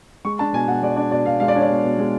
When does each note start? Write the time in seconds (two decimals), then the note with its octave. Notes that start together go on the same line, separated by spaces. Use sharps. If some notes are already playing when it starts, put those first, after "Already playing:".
0.25 G#3 C#6
0.39 D4 A5
0.53 B2 G#5
0.68 B2 F#5
0.82 G#3 D5
0.96 D4 D5
1.11 B2 D5
1.25 B2 F5
1.40 G#3 F5
1.48 D5
1.55 D4 C#5
1.62 D5
1.69 B2
1.84 B2
1.98 G#3